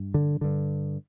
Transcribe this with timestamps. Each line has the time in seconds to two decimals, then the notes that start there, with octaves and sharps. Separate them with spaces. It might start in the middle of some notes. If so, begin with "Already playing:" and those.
Already playing: G2
0.14 D3
0.41 G2 D3